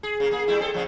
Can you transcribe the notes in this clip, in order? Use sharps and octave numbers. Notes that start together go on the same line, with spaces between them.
G#4
C#3 A#3
A#3 G#4
G3 A3 E4
C4 G#4 A4
A2 C#3 F3